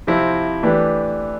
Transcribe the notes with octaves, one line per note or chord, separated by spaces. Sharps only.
C3 F3 C4 E4
E3 A3 D4 G4 B4